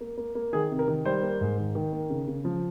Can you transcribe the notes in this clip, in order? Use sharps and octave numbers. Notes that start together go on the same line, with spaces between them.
A#3
A#3
A#3
D#3 G#4
C3
A#4
D#3
G3 C5
A#3
G#2
D#3
D#3
A#3
C#3
C#3
F3